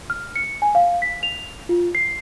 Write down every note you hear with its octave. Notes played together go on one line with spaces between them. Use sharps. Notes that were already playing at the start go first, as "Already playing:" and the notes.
F6
C#7
G#5
F5
B6
F7
F4
C7